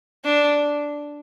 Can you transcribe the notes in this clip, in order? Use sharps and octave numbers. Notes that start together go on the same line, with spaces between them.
D4